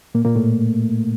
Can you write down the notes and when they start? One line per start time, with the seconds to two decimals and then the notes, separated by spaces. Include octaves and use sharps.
0.15 A#2 A#3
0.25 A#2 A#3
0.36 A2 A3